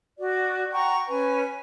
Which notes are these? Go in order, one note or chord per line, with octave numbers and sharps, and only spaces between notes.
F#4 D5
F#5 G5 A#5 C#6
C#4 B4 G#5